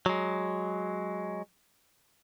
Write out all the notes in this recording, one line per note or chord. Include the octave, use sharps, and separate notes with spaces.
F#3 G#3